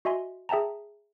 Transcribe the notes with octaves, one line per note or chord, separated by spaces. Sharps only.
F#4 D#5 E5 G#5 C6
G#4 E5 G5 A5 A#5